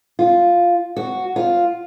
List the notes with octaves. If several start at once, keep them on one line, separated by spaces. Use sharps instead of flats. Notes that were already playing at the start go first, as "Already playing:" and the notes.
F4
F#4
F4